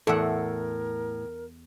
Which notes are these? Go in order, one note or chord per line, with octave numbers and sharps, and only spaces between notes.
E2 A2 A4 A#4 E5 F#5